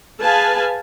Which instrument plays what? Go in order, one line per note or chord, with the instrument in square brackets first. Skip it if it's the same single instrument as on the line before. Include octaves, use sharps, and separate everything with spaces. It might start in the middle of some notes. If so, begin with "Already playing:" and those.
[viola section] G#4 B4 F5 G#5 A5